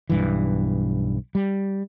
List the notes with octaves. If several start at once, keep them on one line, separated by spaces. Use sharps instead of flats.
B1 G2 E3
G3